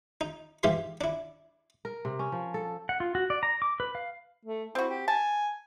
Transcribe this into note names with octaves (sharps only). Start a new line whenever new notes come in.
D#4
G#2 E3 G4 E5 F5 C6
D4 E4
A#4
C3
C#4
F3
A4
F#5
F4
F#4
D5
A#5
D6
B4
F5
A3
C4 E4 F#4
G4
G#5 A5